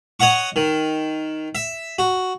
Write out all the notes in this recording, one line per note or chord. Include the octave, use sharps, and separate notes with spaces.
C#5 D#5 F#5 C#6
D#3
E5
F#4